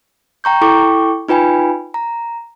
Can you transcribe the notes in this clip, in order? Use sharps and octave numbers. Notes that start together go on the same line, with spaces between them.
G5 A#5 C#6 G6
E4 A4 G5 C#6 D6
D#4 F4 B4 G5 G#5 B5
A#5